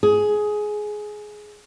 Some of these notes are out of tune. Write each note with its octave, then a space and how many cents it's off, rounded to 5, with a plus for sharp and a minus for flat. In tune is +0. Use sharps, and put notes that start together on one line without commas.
G#4 +15